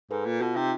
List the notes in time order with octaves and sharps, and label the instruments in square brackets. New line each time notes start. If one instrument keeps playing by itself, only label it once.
[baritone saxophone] G#2 [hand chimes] A4 B4
[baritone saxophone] A#2
[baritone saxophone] B2 [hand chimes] F4
[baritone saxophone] C3 [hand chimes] D#4